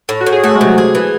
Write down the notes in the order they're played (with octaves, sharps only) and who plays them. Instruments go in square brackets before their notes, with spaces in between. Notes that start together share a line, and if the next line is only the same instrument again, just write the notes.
[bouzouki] A2
[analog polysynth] F#4
[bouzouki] A2
[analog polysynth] G#4
[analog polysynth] A3 [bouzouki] F#4
[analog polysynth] G#3
[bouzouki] C3
[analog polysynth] F#3
[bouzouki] G#4
E3